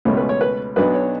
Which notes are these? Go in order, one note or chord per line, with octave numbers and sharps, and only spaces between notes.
C#2 B2 A3 C#4
B4
C#5
B4
B1 B2 F#3 B3 D4 B4
C#5